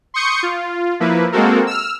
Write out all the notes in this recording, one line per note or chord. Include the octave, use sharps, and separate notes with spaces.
C6 C#6 D#6 G6 C#7
F4
F3 A#3 E4 B4
G#3 A#3 C4 F#4 A4 A#4
E6 F6